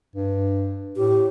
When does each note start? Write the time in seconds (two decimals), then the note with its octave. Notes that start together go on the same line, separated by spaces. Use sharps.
0.16 G2
0.96 A2 G4